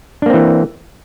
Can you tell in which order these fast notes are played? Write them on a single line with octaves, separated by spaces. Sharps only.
D4 A#3 C4 E3